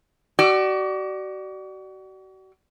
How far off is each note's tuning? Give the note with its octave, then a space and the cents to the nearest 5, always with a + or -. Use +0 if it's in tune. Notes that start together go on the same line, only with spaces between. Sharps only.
F#4 +40 D5 +15